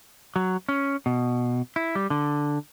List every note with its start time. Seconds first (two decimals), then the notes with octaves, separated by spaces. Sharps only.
0.36 F#3
0.69 C#4
1.06 B2
1.76 E4
1.95 G3
2.10 D3